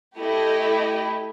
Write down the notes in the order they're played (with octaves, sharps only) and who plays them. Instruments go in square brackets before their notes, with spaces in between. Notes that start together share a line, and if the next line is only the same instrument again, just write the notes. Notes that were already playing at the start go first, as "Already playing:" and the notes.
[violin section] A3 E4 G4 D#5